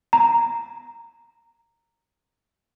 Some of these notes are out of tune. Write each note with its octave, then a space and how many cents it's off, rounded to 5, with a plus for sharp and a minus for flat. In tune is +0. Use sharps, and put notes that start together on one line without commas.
A#5 -10